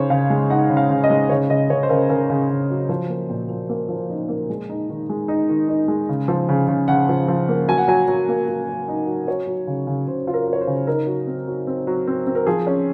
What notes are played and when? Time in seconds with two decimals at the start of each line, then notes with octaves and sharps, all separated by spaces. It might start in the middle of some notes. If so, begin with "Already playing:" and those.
Already playing: C#3 D#4 C5 C#5
0.10 C#3 F5
0.30 G#3
0.50 D#4 F#5
0.70 C#3
0.77 F5
0.90 C#3
1.04 D#5
1.10 G#3
1.29 C#3 C#5
1.49 C#3 D#5
1.69 C#3 C#5
1.83 C5
1.89 C#3 A#4
2.09 C#3 A#4
2.30 C#3
2.50 C#3
2.70 F#3
2.89 F3 C5
3.09 A#3
3.30 A#2
3.49 F3
3.70 A#3
3.89 F3
4.10 D#4
4.29 A#3
4.50 G#3
4.69 D#4
4.90 D#3
5.09 G#3
5.28 D#4
5.49 D#3
5.68 D#4
5.88 G#3
6.09 C#3
6.28 F3
6.49 C#3
6.68 C#3
6.88 C#3 F#5
7.09 F3
7.28 F3
7.49 A#3
7.68 F#3 G#5
7.78 F#5
7.88 F#3 G#5
8.08 F#3
8.29 A#3
8.48 F#3
8.68 F#3
8.88 D#4
9.07 F#3
9.27 F#3 C#5
9.47 F#3
9.67 C#3
9.87 C#3
10.07 C#3 C5
10.27 F4
10.34 A#4
10.47 F4
10.53 C#5
10.61 C5
10.67 C#3
10.87 D#4 A#4
11.07 F#3
11.27 C4
11.48 F#3
11.67 C4
11.87 F#3
12.07 C4
12.27 C4
12.35 A#4
12.47 F3 G#4
12.67 C#4